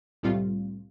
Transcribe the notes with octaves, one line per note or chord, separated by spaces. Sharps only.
C2 A2 G3 A3 C4 F4